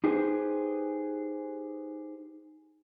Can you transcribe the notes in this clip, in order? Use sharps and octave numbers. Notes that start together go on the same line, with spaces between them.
D#4 G4 G#4 B4 C5